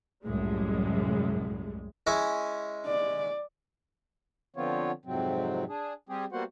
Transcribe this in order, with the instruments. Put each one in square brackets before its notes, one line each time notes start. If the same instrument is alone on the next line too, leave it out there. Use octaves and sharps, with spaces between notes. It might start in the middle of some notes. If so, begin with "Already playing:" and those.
[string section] C2 F#2 A2 G3 G#3
[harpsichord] G#3 C#4 E4
[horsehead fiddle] D5
[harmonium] D3 F3 B3 C4 F4 C#5
F2 G#2 C3 F#3 C4
D4 G#4
G3 C4 G4 G#4
G3 A#3 B3 F#4 C5 F#5